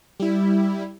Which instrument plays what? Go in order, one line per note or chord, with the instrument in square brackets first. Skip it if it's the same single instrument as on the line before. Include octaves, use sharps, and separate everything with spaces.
[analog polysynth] G3 E4